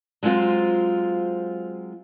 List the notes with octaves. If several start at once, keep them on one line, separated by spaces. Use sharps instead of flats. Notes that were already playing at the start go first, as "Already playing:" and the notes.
F#3 G#3 C4 F4 C5